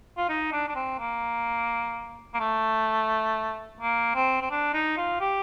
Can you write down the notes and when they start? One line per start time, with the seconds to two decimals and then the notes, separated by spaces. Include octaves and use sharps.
0.18 F4
0.29 D#4
0.53 D4
0.69 D4
0.76 C4
0.99 A#3
2.34 A#3
2.40 A3
3.81 A#3
4.15 C4
4.41 C4
4.51 D4
4.74 D#4
4.97 F4
5.21 G4